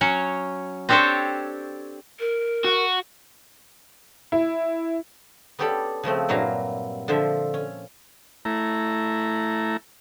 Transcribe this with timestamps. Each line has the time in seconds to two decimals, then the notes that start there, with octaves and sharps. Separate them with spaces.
0.01 F#3 C#4 C#5
0.89 C4 D4 G4 A4 C5 C#5
2.20 A#4
2.65 F#4
4.32 E4
5.59 B3 C#4 G4 A4 D5 B5
6.03 C#3 F3 A3 C4
6.29 G2 A#2 F#3 E4 F5 A#5
7.08 D3 F3 C5 E5
7.54 C#4
8.45 A3 E4 A#5